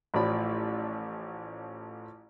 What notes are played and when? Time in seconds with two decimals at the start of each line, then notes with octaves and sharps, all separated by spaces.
0.14 A1 A2 F3 D5 B5